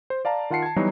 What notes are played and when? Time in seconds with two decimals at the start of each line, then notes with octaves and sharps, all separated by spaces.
0.10 C5
0.25 D5 F5 A5 A#5
0.50 D#3 F4 F#5 A5 C7 C#7
0.63 A5 G#6
0.76 E3 F#3 G3 B3 D#4 F#4